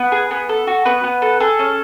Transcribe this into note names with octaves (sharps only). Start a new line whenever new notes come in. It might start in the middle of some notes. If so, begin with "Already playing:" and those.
Already playing: B3 B4
G#4
B3
A4
F#4
B3 B4
B3
A4
G#4 A4
C#4